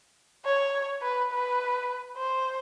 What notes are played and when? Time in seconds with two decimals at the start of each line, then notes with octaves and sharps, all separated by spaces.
0.45 C#5
1.02 B4
1.31 B4
2.17 C5